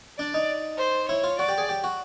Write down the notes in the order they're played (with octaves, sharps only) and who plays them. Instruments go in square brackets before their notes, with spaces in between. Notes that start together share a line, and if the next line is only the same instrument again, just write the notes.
[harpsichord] D4 [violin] D5
[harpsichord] D#4
[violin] C5
[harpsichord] E4 [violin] C#5
[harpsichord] F4
[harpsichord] F#4 [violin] D5
[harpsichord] G4
G#4
G4
F#4